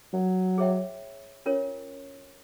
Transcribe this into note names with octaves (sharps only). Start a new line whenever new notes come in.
F#3
G#4 C#5 E5 G5
C#4 F4 A#4 C#5